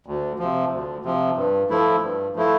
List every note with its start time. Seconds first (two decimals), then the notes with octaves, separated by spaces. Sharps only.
0.06 D2
0.39 C3 F3
0.71 D2
1.04 C3 F3
1.37 G2
1.70 F3 A3 E4
2.03 G2
2.35 F3 A3 E4